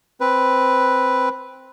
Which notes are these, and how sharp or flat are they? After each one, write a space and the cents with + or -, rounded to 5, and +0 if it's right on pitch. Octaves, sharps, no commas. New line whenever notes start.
C4 +0 B4 +0